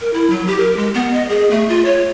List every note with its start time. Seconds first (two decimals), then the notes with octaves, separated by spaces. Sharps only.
0.01 A#4
0.13 E4
0.30 F#3
0.47 G4
0.60 A#4
0.77 G#3
0.94 B3
1.13 D#5
1.29 G#4
1.51 A3
1.69 F4
1.85 C#5